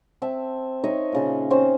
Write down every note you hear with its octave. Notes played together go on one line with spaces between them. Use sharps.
C4 E5 A5
D#4 C#5 D#5 E5
A#2 C#3 C6
C4 C#4 C5